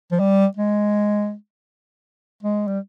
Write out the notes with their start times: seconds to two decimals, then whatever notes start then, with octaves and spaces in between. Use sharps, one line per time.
0.12 F3
0.20 G3
0.57 G#3
2.43 G#3
2.68 G3